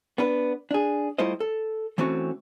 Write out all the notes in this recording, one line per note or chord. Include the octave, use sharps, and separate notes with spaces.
B3 D4 B4
D4 G#4
G3 A3 E4 F4 C5 D#5
A4
E3 A3 C4 C#4 F#4